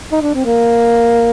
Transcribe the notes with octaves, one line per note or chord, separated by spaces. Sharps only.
D#4
D4
C4
A#3